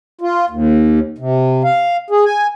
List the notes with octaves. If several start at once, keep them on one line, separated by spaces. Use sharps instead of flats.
F4
D#2
C3
F5
G#4
G#5